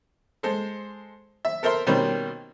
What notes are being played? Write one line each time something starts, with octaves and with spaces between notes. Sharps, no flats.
G#3 A4 C5
E5
A4 A#4 C5 E5 C6
B2 D#3 G3 A#3 C4 C#4